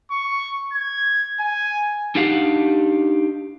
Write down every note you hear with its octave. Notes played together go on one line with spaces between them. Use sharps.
C#6
G#6
G#5
D4 D#4 G4 F5 F#5